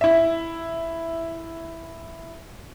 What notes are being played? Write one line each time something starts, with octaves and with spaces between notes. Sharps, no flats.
E4 E5